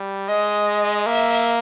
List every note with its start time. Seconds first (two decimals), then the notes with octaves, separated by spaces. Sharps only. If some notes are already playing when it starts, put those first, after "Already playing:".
Already playing: G3
0.28 G#3 D#5
1.06 A#3 E5